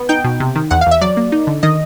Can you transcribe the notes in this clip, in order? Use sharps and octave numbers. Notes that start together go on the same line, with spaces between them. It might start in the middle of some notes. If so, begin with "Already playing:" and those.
Already playing: B3
D#4 G5
B2
C3
D#3
E2 F#5
F5
E2 E5
F#3 D5
A#3
D#4
D3
D#3 D#5